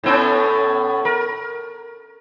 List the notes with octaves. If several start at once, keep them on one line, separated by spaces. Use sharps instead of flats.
A2 B3 C#4
A#4